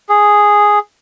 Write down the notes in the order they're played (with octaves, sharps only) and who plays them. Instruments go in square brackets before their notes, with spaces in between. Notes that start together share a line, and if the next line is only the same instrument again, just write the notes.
[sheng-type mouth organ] G#4